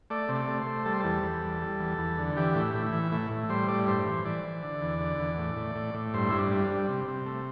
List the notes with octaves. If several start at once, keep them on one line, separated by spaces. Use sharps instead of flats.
A3 D5
C3
D5
A3
C5
A3
G3 A4
C5
E2 A4
E2
G3
G3
E2
E2
D3
E3 G4
A2 D4
E4
A2
E4
E3
A2 E4
A2
G3 C5
A2 D5
G2 C5
E3
E3 D5
E3
D3
E2
D3
E2
A2
A2
A2
A2
G2 C5
G2 E4
D4
G3
D4
G3
C3
C3
A3